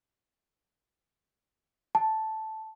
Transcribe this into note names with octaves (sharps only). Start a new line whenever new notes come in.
A5